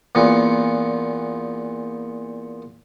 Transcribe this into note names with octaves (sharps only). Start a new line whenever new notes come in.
E2 A#2 B3